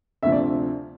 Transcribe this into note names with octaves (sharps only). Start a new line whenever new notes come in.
D2 C3 F3 E5
D5